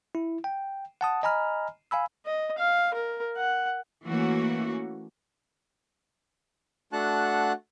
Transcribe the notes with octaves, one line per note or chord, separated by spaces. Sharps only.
E4
G5
F#5 A5 D#6
D#5 G#5 A#5 B5 F6
F5 G#5 B5 E6
D#5
F5
A#4
F#5
E3 A3 A#3 C#4 F#4
A3 D4 F#4 F#5 A5 F#6